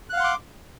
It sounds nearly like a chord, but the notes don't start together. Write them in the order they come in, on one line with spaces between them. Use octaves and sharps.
F#6 F5 F#5 C6 D6